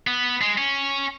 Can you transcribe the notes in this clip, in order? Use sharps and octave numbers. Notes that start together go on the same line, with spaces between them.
B3
G#3
C#4